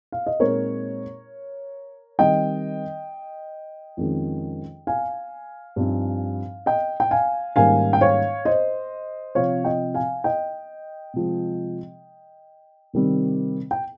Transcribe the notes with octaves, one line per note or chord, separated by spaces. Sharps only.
F5
D#5
A#2 G#3 C4 D#4 A#4 C#5
D#3 G3 C4 D#5 G5
F2 D#3 G#3 C#4
F5 G#5
G2 F3 C4 D#4
D#5 G5
G5
F5 G#5
G#2 D#3 G3 A#3 C#4 F5 G#5
G5
C#5 F5
C5 D#5
C3 F3 C4 C#5 F5
D#5 G5
F5 G#5
D#5 G5
C3 F3 G#3
C3 D#3 G3 C4
G5